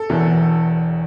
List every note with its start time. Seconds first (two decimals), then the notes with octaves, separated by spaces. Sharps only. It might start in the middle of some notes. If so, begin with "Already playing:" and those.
Already playing: A4
0.09 E1 E2 E3